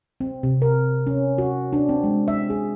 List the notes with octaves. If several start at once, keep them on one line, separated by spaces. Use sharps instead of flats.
C4
C3
A#4
C#4
F#4
D4
C4
G#3
E5
G#4